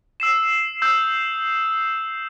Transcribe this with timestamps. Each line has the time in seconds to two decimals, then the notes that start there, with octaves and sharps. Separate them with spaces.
0.20 E6 C7 E7
0.82 D#6 E6 G6